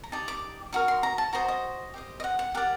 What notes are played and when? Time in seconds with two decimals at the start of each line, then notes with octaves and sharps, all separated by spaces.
0.03 A#5
0.12 D#4 G4 D5 A5
0.28 D6
0.73 D#4 F#4 A#4
0.88 C6
1.03 A#5
1.18 A5
1.33 F#4 C5 D#5 A#5
1.48 D#5
1.94 G4 C5 D#5
2.20 D#5
2.24 F#5
2.39 F#5
2.55 G4 A#4 D5 F#5